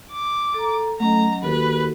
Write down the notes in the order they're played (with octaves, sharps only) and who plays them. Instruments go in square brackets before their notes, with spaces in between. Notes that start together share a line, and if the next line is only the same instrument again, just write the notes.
[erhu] D6
[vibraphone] A4 A#5
[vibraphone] F#3 C#4 D#5 [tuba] A3 [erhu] A#5
[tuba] D#2 [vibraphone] F#4 A4 [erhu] B4